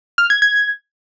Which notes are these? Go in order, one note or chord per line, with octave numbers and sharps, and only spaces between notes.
F6
G#6
G#6